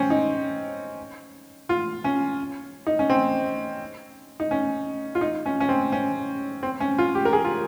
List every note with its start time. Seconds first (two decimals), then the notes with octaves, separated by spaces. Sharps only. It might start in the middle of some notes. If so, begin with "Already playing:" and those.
Already playing: C4 C#4
0.10 D#4
1.69 F4
2.04 C#4
2.87 D#4
2.99 C#4
3.10 C4
4.40 D#4
4.51 C#4
5.15 F4
5.21 D#4
5.46 C#4
5.60 C#4
5.69 C4
5.92 C#4
6.63 C4
6.80 C#4
6.98 F4
7.15 G4
7.25 A#4
7.33 G#4
7.44 F4